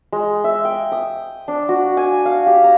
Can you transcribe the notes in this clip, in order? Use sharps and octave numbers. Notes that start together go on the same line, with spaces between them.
G#3
E5
G5
D#6
D4
F#4
G#5
F5
G4
A#5